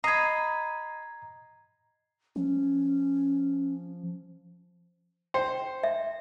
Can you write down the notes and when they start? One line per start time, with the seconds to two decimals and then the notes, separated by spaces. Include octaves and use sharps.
0.04 D#5 A#5 B5 G#6 C7
2.36 F3 C#4
5.34 C5 G5
5.83 E5